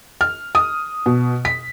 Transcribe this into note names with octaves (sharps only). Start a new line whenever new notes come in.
F6
D#6
B2
B6